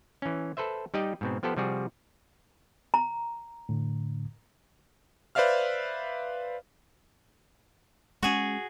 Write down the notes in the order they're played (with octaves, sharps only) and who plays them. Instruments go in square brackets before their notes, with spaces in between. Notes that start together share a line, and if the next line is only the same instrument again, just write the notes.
[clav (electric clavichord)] E3 C#4
A4 B4 C5 E5
G3 D#4 G4 D5 D#5 G5
G#2 B2 C4
F3 B3 G4 A4 C5
C3 F3 G3 F#4 G#4
[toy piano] A#5
[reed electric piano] A2 D3
[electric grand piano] B4 C5 D5 E5 F5 F6
[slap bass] G#3 C#4 [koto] F#4 G#4